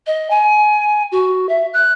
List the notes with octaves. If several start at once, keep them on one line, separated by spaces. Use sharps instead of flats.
D#5
G#5
F#4
E5
F#6